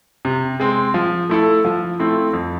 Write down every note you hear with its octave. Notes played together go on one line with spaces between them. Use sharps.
C3
G#3 C4
F3
A3 E4 A4
F3
A3 C4 E4
F2